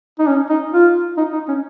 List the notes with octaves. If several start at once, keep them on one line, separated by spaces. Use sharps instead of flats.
D#4
C#4
D#4
F4
D#4
D#4
C#4